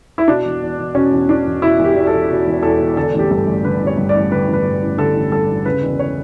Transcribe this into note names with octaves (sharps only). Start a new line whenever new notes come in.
E4
B2 D4
E1
E2
E1
B2 C#4
E1
E2 D4
E1
B2 E4
E1
G4
E2
A4
E1
B2
E1
E2 A4
E1
D3 A4
A1
G4
G2 A4
A1
D3 B4
A1
C#5
G2
D5
A1
D3 B4
A1
B4
G2
A1
D3 A4
A1
G2 A4
A1
C#3 B4
E1
C#5